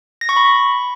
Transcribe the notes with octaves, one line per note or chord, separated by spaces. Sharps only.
A#6
C#6
B5